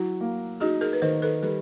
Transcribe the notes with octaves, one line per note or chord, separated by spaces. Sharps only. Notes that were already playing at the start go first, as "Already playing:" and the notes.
Already playing: F#3 E4 F#4
A#3
D#4 F#4 G#4
G#4 A#4
B4
D#3 A#4 C5
A4 B4
G3 A4 B4